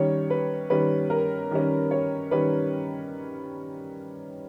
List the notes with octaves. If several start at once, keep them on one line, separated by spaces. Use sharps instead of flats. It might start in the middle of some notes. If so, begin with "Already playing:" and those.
Already playing: D#3 G3 C#4 C#5
B4
D#3 G3 C#4 B4
A#4
D#3 G3 C#4
C#5
D#3 G3 C#4 B4